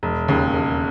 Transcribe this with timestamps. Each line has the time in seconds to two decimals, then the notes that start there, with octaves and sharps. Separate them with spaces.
0.03 E1
0.28 D#2 C#3
0.54 E1